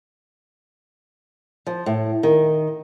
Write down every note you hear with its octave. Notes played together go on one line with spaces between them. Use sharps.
F3
A2
D#3